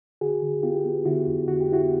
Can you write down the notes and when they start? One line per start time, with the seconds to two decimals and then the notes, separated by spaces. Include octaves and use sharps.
0.21 D3 F#4 G#4
0.42 D3
0.63 B3 F4 G4
0.85 B3
1.05 D3 E4 F#4
1.27 F2
1.48 D3 F#4
1.61 G4
1.69 B3 E4 F#4